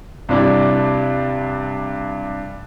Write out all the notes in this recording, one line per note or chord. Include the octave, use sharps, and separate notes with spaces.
G2 C3 D4 E4 G4